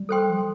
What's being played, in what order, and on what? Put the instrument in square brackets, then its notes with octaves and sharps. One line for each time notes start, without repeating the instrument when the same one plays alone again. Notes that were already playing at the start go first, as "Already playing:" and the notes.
Already playing: [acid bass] G3
[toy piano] A4 C5 G5 C6
[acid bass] F3